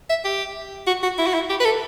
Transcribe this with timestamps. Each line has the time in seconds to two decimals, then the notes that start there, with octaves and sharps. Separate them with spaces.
0.10 E5
0.25 G4
0.87 F#4
1.03 F#4
1.18 E4
1.26 F#4
1.34 E4
1.49 G4
1.60 B4
1.65 A4